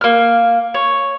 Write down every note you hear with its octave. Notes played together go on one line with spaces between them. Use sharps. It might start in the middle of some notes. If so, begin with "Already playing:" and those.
A#3 F6
C#5